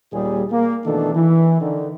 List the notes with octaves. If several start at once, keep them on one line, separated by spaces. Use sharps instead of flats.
D#2 A#2 G3 G#4
A#3
B2 D#3 E3 A3 D4 A4
E3
D3 D#3